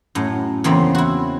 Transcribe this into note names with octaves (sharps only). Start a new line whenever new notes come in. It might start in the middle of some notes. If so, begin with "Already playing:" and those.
F#2 A2
E2 C#3 A#3 C4 D5 B5
E4 F#4